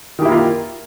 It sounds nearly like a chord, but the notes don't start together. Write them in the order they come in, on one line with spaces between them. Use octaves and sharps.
D#3 G4 E4 A#3 F4